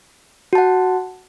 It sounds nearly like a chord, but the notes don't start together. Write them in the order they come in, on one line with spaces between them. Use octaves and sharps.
F#4 A5 F#5